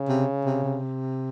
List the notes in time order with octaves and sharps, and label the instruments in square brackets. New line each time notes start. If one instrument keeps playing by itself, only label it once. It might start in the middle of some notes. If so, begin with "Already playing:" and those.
Already playing: [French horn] C#3
[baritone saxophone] C3
C3
C3